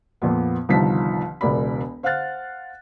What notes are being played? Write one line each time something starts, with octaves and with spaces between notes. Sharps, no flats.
F2 A#2 B3
G1 C2 D#3 F3 A5 B6
E1 C#2 A#4 D5 B5
C5 F5 F#5 F6 F#6 A6